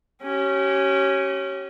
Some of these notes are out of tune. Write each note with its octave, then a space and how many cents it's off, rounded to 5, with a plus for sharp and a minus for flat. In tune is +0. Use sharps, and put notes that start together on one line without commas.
C#4 -10 G4 -40